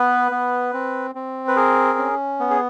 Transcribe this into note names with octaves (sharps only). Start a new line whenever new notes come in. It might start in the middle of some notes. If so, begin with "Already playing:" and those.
Already playing: B3 B4
B3
C4
C4
B4
G#4 A#4
C#4
B3
G#4